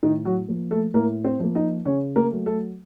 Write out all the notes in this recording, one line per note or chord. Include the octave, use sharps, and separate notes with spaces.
A2 D#3 D#4
F#3 F#4
F3 A#3
A3 A4
A2 A#3 A#4
C4 C5
F3 A#3
D#4 D#5
C#3 C#4 C#5
A#3 A#4
F#3 A3
A3 A4